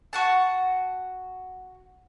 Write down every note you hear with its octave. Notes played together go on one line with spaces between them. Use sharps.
F#4 F#5 A5